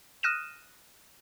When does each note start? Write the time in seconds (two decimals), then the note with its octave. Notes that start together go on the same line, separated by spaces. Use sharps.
0.23 D#6 F6 F#6 A#6 D#7 E7